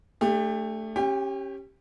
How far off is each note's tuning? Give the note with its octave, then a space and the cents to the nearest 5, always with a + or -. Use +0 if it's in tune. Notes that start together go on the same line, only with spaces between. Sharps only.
A3 +0 D4 +0 G4 +35
C#4 -20 G4 +0 G5 +45